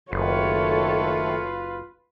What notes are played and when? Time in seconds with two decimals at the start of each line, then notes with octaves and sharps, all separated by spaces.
0.12 F#1 D#3 A3 F4 A4 B4 C#5 F5